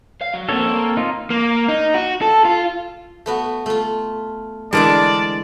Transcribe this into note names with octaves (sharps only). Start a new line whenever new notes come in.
F5
F#3
A#3 C4 D4 A4 C#5
A#3
D#4 F4
A#3
D#4
F#4
A4
F4
A3 B3 F#4
A3 F4
D3 E3 G#3 D4 A#4 D5 A5